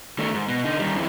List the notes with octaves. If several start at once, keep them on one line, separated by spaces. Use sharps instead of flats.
D#3 A3
G#2
B2
D3 D#4
D#3 G3
F2 E3